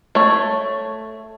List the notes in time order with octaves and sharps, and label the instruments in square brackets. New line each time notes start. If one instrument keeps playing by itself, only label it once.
[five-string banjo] A3 C#5